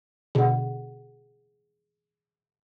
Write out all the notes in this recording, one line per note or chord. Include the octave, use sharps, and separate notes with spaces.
B2 D3 G#4 F#5